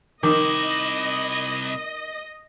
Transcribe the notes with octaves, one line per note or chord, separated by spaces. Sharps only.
C2 D#3 E4 D#5 D6